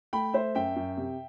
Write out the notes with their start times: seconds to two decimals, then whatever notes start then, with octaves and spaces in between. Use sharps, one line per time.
0.13 A3 G5 B5
0.34 A3 C5 E5
0.55 F#2 E5 G5
0.76 F#2
0.97 C3